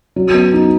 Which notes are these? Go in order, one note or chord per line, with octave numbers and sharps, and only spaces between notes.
F#3
B3
D#4